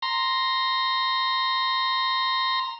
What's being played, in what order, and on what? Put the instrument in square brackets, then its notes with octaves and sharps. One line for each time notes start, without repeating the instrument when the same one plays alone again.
[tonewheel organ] A#5 C6